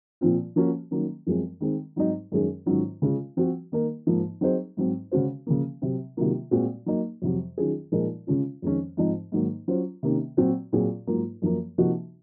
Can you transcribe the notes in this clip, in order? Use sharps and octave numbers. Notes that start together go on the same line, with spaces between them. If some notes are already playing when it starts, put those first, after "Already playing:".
A#2 F3 C4 F4
F3 A#3 C#4 F#4
D#3 F#3 A#3 C#4
F#2 F3 G#3 C4
D#3 G#3 C4
G#2 F#3 C4 D#4
F#2 D#3 G#3 C#4 G#4
G#2 D#3 F#3 C#4 F4
C#3 G#3 C#4 F4
F3 C4 F#4
D#3 A#3 D#4 A#4
G#2 F3 A#3
F#3 C4 D#4 G#4 C5
G#2 F#3 C4
C#3 G#3 C#4 F#4 C5
C#3 F3 A#3
C3 F#3 C4
C3 D#3 F#3 A#3 F4
A#2 G#3 C4 F#4
F#3 A#3 D#4
F2 C3 F#3
D#3 F#3 C#4 F4 G#4
A#2 F3 G#3 D#4 A#4
C#3 G#3 C#4 F4
F2 D#3 G#3 C#4
G#2 F3 C4 D#4
G#2 D#3 F#3 A#3
F#3 C#4 F4 C5
C3 D#3 A#3 C#4
A#2 F#3 C4 F#4
A#2 F#3 C4 F4 G#4
G#2 F#3 A#3 F4 A#4
F#2 F3 A#3
C3 F3 A#3 D#4 F#4